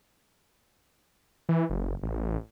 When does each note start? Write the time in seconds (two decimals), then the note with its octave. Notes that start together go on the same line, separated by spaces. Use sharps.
1.49 E3
1.70 F#1
2.03 A1